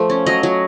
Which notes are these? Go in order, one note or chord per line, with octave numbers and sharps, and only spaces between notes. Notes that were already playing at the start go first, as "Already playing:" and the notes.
Already playing: F3 A3
C#4
F#3 D#5
F#3